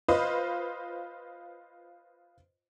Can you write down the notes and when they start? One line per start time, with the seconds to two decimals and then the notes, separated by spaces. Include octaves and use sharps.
0.08 F4 B4 C5 D#5